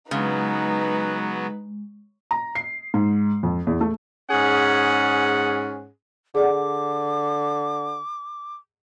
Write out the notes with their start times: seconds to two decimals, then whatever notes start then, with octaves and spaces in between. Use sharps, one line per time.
0.11 C#3 F#3 G#3 B3 D#4 B4
2.31 A#5
2.55 C7
2.94 G#2
3.43 F2
3.67 E2
3.81 A3
4.30 G#2 C#4 G#4 F#5
6.35 D3 G#4 D5 F#5 D6